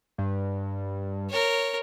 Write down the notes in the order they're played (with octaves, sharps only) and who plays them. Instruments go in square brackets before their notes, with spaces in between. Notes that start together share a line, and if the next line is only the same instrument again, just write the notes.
[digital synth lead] G2
[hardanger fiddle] A#4 C#5